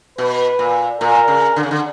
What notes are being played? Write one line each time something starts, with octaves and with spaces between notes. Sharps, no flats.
B2 B4
A#2
A#2 A#4
C#3
D3
C#3
D3